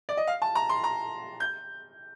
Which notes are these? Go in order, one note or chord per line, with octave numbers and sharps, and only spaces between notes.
D5
D#5
F5
A5
A#5
C6
A#5
G6